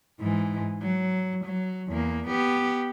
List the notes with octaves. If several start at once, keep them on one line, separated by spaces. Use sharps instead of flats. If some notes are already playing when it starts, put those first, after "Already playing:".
G#2 E3
F#3
F#3
E2 A#3
B3 G4